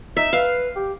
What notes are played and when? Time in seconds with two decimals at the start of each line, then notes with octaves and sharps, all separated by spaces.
0.16 D#4 E5
0.33 B4 F5
0.76 G4